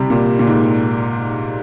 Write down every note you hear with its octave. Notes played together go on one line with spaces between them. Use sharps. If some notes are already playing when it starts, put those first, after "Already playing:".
Already playing: C3 G3
A#2
A#2
G#2